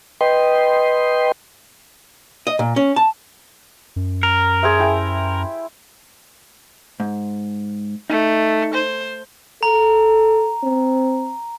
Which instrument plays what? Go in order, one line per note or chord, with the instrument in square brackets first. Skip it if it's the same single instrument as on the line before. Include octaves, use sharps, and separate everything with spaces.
[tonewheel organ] B4 D#5 G5 C6
[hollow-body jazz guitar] D#5
A#2
C#4
A5
[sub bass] F#2
[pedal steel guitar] A#4
[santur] G#4 C5 E5
E4 G5 A5
[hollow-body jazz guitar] G#2
[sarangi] A3 [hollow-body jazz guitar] D#4
[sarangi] C5
[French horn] A4 [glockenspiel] A#5
[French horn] C4